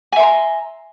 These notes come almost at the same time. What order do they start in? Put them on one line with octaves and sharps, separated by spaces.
G#5 E5 C6 A#5